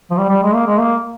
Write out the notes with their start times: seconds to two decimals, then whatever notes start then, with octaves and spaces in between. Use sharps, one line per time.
0.11 F3
0.18 G3
0.29 G3
0.42 G#3
0.54 A#3
0.67 G#3
0.79 A#3